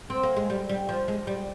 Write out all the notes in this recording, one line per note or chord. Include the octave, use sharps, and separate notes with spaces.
C4
A#3
G#3
G3
G3
F3
G#3
G3